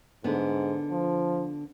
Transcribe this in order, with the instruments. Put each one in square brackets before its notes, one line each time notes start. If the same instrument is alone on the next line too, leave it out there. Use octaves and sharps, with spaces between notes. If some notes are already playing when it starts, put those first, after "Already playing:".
[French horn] G#2 [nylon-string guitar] D3 B3
[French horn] F3